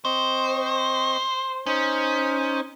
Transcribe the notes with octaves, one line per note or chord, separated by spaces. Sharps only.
C4 C5 D#5 C#6
C#4 D#4 C5